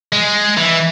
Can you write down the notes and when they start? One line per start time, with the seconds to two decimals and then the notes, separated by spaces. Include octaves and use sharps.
0.13 G#3
0.57 E3